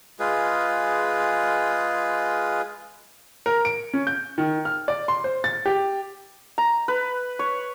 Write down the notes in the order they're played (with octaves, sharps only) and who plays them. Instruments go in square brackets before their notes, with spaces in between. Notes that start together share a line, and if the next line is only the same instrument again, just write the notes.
[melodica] G#3 F4 G#4 B4
[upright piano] A#4
D7
C#4
G6
D#3
F6
D5
C6
C5
A6
G4
[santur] A#5
B4
C#5